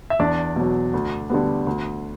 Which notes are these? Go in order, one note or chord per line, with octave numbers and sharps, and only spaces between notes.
E5
E2 D4 D5
B2 F#3
D2
D3 G3 B3
D2